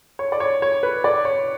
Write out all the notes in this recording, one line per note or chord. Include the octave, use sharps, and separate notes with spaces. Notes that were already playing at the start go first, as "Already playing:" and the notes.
C#5
D5
C#5
C#5
B4
D5
C#5